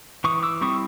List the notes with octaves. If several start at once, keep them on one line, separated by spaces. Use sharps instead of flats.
E3 C#6 D#6
D6 E6
G3 C4 E4 C#6 D#6